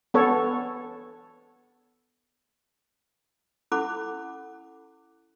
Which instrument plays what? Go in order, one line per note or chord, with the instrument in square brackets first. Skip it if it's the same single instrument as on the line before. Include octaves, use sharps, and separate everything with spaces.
[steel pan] B3 A4 C#5
[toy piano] C#4 E4 A4 F#5 B5 D6